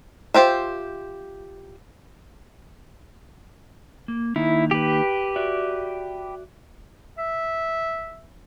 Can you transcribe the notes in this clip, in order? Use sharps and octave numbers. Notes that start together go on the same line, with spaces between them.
F4 G4 C5 E5
A#3
D#3 A#3 D#4 E4
G4 B4
F#4 D5 E5
E5